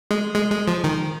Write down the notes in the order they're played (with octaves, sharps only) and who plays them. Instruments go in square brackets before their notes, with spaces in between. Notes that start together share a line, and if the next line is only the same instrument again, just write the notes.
[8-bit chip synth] G#3
G#3
G#3
F3
D#3